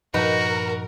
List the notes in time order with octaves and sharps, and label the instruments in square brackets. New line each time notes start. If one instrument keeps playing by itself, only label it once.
[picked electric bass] G2 A#2 F3 [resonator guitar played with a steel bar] D#4 B4 [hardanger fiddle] F#4 [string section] A#4